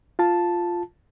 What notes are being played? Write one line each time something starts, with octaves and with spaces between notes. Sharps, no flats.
F4 A5